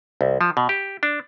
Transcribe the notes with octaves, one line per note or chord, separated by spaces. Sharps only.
C2
F3
B2
G4
D4